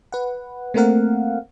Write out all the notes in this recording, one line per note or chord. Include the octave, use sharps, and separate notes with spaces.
B4 F#5
A3 A#3 C4 A#4 F5 F#5